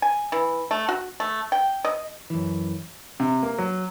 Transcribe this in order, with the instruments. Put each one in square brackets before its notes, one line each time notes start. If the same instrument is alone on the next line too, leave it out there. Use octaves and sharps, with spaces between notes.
[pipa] G#5
E3
A3
F#4
A3
G5
D#5
[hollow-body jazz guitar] F#2 E3
[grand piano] C3
A#3
F#3